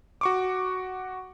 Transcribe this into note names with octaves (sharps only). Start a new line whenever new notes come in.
F#4 C#6 D6